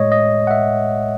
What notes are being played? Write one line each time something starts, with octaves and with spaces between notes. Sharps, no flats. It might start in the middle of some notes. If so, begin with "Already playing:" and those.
Already playing: A2 G#3 C#5 D#5
D#5
F#5
E5